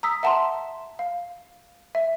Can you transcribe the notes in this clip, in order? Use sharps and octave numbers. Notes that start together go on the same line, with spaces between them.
A#5 D#6 E6 B6
E5 F#5 A5 A#5 C6
F5
E5